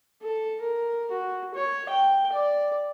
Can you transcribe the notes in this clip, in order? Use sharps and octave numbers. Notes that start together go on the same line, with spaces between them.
A4
A#4
F#4
C#5
G5
D5